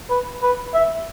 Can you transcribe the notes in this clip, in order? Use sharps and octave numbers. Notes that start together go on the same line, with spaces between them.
B4
B4
E5